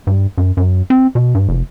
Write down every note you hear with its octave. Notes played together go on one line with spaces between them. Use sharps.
G2
F#2
F#2
C4
B2
G2
F1